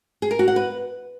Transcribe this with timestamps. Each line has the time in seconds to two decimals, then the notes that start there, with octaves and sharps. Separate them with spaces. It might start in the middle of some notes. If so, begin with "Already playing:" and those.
0.22 G#4
0.31 A#4
0.39 F#4
0.48 F#5
0.56 B4